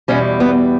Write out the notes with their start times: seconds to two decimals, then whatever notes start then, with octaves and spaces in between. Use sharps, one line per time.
0.08 E2 B2 G3 C#4
0.40 B3